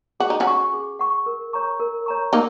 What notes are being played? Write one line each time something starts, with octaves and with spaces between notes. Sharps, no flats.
F#4 G#4
D#4
C#4 F#4
F#5 C#6
G#4
F#5 C#6
A#4
C#5 A#5 C#6
A#4
C#5 A#5 C#6
A#3 D#4 A#4